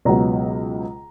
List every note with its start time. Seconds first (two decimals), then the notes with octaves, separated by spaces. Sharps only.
0.05 C#2 B2 F#3 B3 A#5